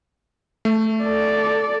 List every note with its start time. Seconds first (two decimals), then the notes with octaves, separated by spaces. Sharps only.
0.65 A3
1.04 A4 D5